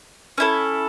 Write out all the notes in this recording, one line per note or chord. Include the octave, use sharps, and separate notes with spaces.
C#4 E4 A4